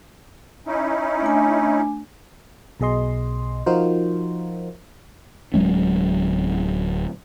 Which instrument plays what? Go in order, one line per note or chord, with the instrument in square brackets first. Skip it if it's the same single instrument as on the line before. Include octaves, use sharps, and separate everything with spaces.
[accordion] C#4 D#4 E4
[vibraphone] A3 D4 G#5
[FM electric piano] B1 B2 G#4 D#5 C6
F3 D#4 F4 F#4 A#4 C5
[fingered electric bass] D1 F#3 G#3 C#4